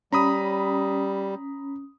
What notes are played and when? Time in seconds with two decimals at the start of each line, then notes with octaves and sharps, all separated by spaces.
0.13 G3 C#4 A#5 B5 D#6